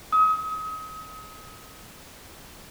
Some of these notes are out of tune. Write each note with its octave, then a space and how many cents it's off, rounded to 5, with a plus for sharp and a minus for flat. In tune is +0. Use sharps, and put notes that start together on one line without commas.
D#6 +35